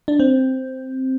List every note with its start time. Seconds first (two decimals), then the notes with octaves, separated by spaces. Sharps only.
0.08 D4
0.19 C4